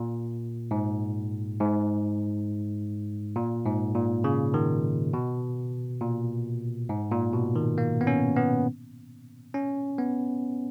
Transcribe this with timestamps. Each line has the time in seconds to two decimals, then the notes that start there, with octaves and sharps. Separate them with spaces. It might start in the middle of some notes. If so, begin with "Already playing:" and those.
Already playing: A#2
0.71 G#2
1.60 G#2
3.36 A#2
3.66 G#2
3.95 A#2
4.24 C#3
4.54 D#3
5.14 B2
6.01 A#2
6.89 G#2
7.11 A#2
7.34 B2
7.56 D#3
7.78 A#3
8.01 B3
8.07 C#4
8.36 B3
9.54 C#4
9.98 B3